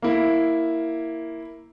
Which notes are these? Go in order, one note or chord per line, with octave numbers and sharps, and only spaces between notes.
A#3 E4